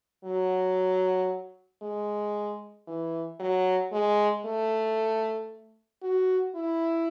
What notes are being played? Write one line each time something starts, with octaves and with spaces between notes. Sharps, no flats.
F#3
G#3
E3
F#3
G#3
A3
F#4
E4